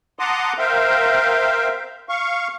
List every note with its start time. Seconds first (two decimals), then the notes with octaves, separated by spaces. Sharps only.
0.19 F#5 A5 A#5 C6 D6 D#6
0.58 A#4 C5 E5 F5 G5
2.09 F5 C#6